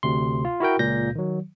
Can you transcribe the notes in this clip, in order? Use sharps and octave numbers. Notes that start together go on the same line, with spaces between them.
D2 C3 C6
F4
E4 F#4 A#4 G5
C#2 A#2 G6 A#6
D#3 F#3